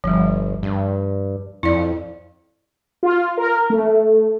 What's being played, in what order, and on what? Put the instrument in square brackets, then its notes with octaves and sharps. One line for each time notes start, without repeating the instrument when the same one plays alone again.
[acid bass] G1 [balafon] F3 G3
[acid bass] G2
[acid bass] F2 [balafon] E4 D5
[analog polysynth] F4
A#4
A3